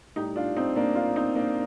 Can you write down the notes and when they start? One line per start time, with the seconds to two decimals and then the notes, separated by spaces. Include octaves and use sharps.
0.16 A2 D#4 G4
0.20 G3
0.36 D4 F4
0.56 C4 D#4
0.76 A#3 D4
0.95 D4 F4
1.16 C4 D#4
1.35 A#3 D4